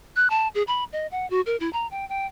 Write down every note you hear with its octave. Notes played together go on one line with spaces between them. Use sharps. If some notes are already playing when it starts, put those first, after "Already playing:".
F#6
A5
G#4
B5
D#5
F#5
F#4
A#4
E4
A#5
G5
G5